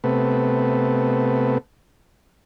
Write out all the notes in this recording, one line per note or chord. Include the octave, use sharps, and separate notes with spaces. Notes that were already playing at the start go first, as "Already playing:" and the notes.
C3 A3 B3